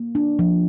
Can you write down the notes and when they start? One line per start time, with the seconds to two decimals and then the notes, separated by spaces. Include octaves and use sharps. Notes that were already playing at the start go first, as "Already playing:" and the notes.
Already playing: A#3
0.15 D4
0.39 F3